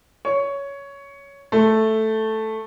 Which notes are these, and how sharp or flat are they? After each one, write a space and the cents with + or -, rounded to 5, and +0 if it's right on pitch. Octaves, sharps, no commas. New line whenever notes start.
C#5 +10
A3 +0